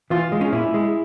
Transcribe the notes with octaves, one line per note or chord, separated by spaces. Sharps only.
E3 F4
G#3
C#4
A#2 E4
G#3